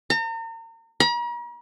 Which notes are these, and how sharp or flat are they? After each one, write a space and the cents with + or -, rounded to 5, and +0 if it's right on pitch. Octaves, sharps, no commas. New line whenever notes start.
A#5 -40
A#5 +45